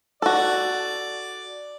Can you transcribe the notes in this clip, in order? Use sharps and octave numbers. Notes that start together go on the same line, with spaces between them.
F#4 A4 D5